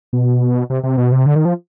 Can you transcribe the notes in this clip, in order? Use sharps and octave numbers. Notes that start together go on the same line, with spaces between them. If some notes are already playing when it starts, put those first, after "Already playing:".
B2
C3
C3
B2
C3
D3
D#3
F3